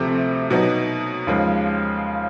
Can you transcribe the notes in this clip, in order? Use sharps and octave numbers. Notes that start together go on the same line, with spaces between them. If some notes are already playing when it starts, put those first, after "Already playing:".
Already playing: D2 C3 F3 A3 C4
B2 F#3 B3 D#4
D#2 C#3 F3 G#3